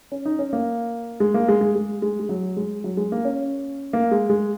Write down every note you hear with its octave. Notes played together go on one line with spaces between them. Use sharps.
C#4
D#4
C#4
A#3
G#3
A#3
G#3
G#3
G#3
G#3
G#3
F#3
G#3
F#3
G#3
A#3
C#4
A#3
G#3
G#3